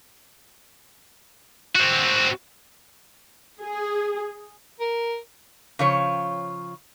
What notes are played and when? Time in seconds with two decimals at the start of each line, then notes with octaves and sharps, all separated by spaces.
1.75 C4 F#4
3.61 G#4
4.80 A#4
5.79 C#3 F3 C#5